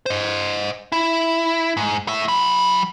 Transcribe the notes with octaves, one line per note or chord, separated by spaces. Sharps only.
C5 D#5
E4
G#2
A2 E5
F#3 B5